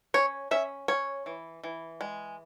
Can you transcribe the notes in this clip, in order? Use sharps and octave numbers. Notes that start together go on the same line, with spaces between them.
C#4 C#5
C#4 E5
C#4 C#5
E3
E3
G#3